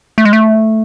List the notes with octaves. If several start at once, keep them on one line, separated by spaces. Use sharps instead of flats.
A3
G#3
A3